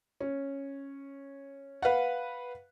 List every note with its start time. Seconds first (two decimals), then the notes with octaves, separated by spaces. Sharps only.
0.20 C#4
1.82 B4 F5 F#5